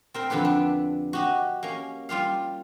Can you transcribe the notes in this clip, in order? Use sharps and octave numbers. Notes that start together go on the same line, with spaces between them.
C4 A#4 G5
F2 D3 B3 G4 B4
D4
F#4 G4 D#5
A#3 C#4
G3 F4 G4 F5